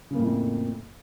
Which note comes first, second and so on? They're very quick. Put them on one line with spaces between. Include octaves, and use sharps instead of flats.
C#3 A#3 A2 F2